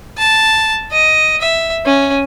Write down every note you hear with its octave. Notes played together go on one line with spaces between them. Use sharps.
A5
D#5
E5
C#4